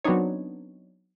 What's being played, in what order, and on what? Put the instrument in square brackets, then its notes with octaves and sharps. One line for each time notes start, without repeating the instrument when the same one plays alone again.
[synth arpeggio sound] F#3 B3 C4 D4 D#4 C#5